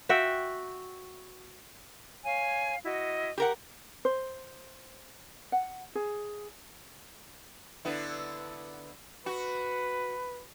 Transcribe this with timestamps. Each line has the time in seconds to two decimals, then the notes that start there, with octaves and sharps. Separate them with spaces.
0.09 F#4 E5 F#5 G5
2.25 C#5 F5 G#5
2.84 E4 F#4 D#5
3.38 G4 A#4 F#5
4.05 C5
5.52 F#5
5.95 G#4
7.85 D3 B3 E4
9.26 F#4 B4